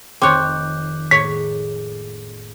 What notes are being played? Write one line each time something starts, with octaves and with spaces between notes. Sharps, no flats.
F1 D#3 C4 C#5 A#5 D6 F#6 G6
A2 G#3 A#3 C#5 B6